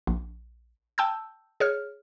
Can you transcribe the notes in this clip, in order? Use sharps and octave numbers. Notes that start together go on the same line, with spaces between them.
A#1
G5 A5 E6 G6
G#4 C#5 F6